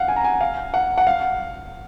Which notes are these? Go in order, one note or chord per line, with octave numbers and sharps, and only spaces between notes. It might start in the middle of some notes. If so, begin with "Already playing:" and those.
Already playing: F5 F#5
G#5
A#5
G#5
F5
F#5
F#5
F5